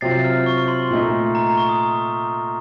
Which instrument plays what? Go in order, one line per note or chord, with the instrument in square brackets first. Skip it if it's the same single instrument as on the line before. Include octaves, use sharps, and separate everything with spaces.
[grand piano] C3 F#3 C4 F4 [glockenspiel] A6 C7
[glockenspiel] F6
C#6
C#6
C6
[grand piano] A#2 A3 D#4
[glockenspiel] A#5
A#5
C#6
D#6